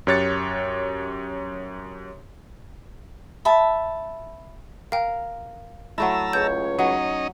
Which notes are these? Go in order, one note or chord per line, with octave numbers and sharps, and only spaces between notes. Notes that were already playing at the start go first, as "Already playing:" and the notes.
F#2 G4 C#5 F#6 A6 C#7
E5 A5 B5
A#4 F5 G5
F#3 A3 E4 A5 A#5 E6
C#2 C#5 G6
F#3 C#4 D#4 D#5